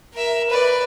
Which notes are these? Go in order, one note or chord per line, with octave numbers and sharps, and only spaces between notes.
A#4 E5
B4 D5